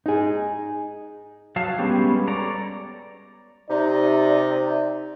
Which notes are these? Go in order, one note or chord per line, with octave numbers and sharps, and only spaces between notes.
D#4 G#4
F#3 F5 A5
G3 G#3 B3 C#4 G4
A4 C#5 D5 A#5
C3 D#4 D5